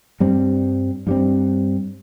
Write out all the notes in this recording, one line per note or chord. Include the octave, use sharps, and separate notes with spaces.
G2 G3 C4
G2 G3 C4